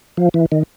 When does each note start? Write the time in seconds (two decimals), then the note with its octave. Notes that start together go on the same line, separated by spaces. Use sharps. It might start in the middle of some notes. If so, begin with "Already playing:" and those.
0.17 F3
0.34 E3
0.52 D#3